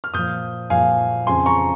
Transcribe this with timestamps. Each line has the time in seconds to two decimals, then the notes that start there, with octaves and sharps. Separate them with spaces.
0.04 F6
0.14 A#2 F3 D#6 G6
0.70 A#2 F3 F5 G#5
1.27 F2 C#3 F3 G#5 C6
1.46 A#5 C#6